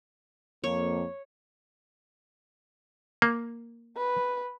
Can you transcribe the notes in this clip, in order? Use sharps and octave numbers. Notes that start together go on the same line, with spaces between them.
F2 A#3 C#5
A#3
B4